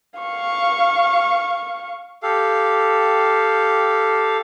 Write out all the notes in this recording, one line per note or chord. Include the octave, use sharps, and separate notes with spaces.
F5 C#6
G4 A4 F5